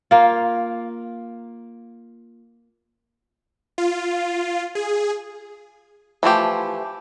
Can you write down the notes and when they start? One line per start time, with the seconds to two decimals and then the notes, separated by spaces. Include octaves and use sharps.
0.11 A#3 F4
3.78 F4
4.75 G#4
6.23 E3 F3 A3 G4